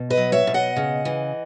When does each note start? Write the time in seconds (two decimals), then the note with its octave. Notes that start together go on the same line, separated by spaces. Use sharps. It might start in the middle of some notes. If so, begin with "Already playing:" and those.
Already playing: B2
0.10 B4 D#5
0.17 F#3
0.32 C#5 E5
0.47 B2
0.54 D#5 F#5
0.76 C#3
1.05 E3